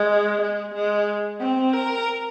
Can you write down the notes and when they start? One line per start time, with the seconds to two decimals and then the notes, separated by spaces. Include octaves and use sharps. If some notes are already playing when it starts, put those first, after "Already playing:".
Already playing: G#3
0.42 G#3
0.74 G#3
1.40 C4
1.73 A#4